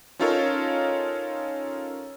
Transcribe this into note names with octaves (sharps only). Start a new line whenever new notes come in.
C#4 D#4 F4 A4 A#4 C#5